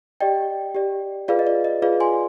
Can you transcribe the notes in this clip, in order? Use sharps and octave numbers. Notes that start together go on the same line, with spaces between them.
G4 D5 D#5 G5
G4 D5
F4 G#4 B4 D5 F5
D#5
D5
D#5
F4 G#4 B4 D5 F5
G#5 C6